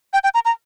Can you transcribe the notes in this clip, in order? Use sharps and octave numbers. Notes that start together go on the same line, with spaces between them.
G5
G5
A#5
A#5